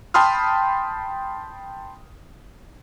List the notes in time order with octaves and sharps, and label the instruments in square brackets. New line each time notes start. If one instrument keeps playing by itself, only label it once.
[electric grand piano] G5 A5 B5 C6 D#6 F6